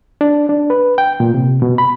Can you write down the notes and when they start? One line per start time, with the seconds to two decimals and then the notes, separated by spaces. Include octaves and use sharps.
0.21 D4
0.49 D4
0.70 B4
0.98 G5
1.20 A#2
1.34 C3
1.62 B2
1.78 B5